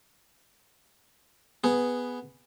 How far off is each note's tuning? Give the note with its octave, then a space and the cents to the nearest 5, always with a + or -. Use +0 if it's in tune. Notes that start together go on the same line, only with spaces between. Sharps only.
B3 +0 G#4 +0